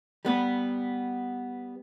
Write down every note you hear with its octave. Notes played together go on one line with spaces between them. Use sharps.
G3 B3 B4